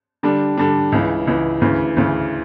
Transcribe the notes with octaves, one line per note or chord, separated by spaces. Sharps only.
D3 G3 D4
D3 G3 D4
C#2 C#3 E3
C#2 C#3 E3
D2 C#3 E3
D2 C#3 E3